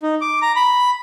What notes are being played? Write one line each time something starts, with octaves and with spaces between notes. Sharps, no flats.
D#4
D6
A#5
B5